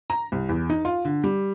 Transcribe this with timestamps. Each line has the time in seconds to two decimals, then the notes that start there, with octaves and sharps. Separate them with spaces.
0.10 A#5
0.32 C2
0.49 E2
0.70 D#4
0.85 F4
1.05 D3
1.24 G3